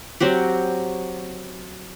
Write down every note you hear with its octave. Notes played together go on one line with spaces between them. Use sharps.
F#3 C4 F#4 G4